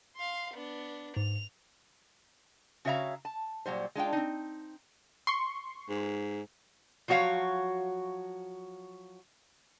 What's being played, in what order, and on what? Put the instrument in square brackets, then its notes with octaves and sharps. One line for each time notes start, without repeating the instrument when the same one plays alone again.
[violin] F5 C6
B3 D4
[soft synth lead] G#2 [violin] F7
[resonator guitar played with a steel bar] C#3 F#4 C#5 E5 F5 A#5
A5
A#2 F#3 G3 C5
G#3 D4 F4 G5
C4 D#4
[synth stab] C6 C#6
[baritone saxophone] G#2
[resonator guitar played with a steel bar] F3 F#3 F#4 C#5 F5